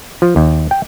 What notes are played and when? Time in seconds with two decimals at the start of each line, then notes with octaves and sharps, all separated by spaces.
0.22 F3
0.36 D#2
0.71 G5